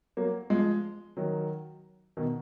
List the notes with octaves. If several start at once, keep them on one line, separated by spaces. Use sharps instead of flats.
F#3 A#3
F3 G#3
D#3 F#3
B2 D#3